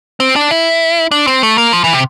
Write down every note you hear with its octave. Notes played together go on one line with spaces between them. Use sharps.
C4
D4
E4
D4
C4
A3
A#3
F3
E3
C3